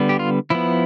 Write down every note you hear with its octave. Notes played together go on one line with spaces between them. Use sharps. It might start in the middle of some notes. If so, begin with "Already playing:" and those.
Already playing: D3 G3 B3
G4
F4
F3 B3 E4